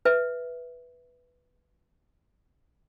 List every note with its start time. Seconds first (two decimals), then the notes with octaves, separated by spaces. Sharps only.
0.05 B4 E5